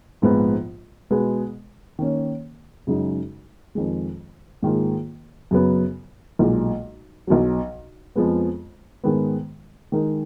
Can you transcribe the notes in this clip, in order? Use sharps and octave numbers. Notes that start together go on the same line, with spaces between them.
A#1 G#2 F3 B3
B2 G#3 B3
D#3 A#3 C#4
F#2 C#3 G#3 D#4 F#4
F2 D#3 G#3
G#2 D#3 A#3 F4 G#4
F#2 C#3 F#3 B3
B1 A#2 G#3
B1 B2 F#3
F2 F3 G#3 B3
G#2 D#3 G#3 B3
D#3 G#3 D#4 A#4